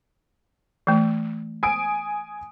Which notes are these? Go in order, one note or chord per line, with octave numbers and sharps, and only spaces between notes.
E3 A3
G#5 D#6 D7